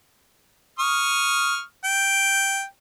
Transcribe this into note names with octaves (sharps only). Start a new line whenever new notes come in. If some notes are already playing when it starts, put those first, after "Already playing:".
C#6 D#6 F6
G5